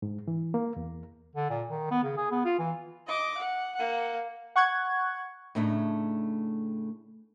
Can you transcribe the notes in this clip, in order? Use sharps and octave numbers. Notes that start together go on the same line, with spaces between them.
G#2
E3
A#3
E2
D3
A#2
D#3
B3
C#3
G#4
B3
F4
E3
D#5 D6
F#5
A#3 F#5
F#5 C#6 F#6 G#6
A2 C#3 A3 D4 D#4